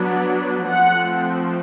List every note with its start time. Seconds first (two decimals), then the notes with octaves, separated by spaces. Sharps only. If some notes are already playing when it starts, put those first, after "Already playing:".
Already playing: F#3 B3 D4
0.67 F3 A3 C4 F#5